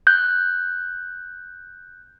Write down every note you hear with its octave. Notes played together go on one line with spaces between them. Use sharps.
F#6 G6